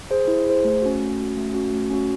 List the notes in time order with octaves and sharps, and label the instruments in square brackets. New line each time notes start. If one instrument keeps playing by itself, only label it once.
[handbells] G#4 C5
E4
G#4 C5
A3
C#4 F#4
A3
C#4 F#4
A3
C#4 F#4
A3
C#4 F#4